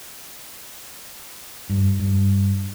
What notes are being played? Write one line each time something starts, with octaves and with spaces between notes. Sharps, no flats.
G2
G2